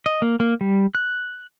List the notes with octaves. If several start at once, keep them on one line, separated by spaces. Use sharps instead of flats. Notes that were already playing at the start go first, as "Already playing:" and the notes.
D#5
A#3
A#3
G3
F#6